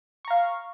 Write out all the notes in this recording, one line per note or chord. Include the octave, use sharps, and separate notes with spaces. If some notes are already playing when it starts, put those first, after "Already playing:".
F5 A#5 C#6